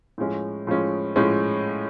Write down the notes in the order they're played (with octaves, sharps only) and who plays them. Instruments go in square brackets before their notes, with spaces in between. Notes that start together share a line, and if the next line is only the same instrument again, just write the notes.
[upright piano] A2 F3 G#3 C#4
A2 F3 G#3 C#4
A2 F3 G#3 C#4